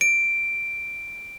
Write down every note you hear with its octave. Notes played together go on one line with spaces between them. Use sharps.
D7